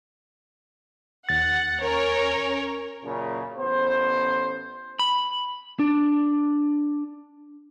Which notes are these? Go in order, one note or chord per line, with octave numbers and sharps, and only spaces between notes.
D#2 F#5 A6
C#4 A#4 C#5
F#2 A#2 C#3
A1 B3 C5
B5
D4